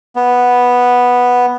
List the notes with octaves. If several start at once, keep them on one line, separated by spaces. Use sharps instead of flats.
B3